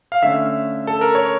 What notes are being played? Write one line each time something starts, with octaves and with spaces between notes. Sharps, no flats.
F5
D3 A3 C#4 E5
A4
A#4
C#5